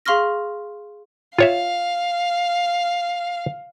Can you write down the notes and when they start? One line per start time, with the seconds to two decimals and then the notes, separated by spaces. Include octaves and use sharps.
0.05 G#4 F5 C6 C#6 F6 A#6
1.39 F4 C#5 E5 F5